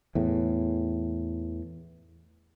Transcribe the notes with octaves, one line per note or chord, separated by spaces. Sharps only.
E2 A2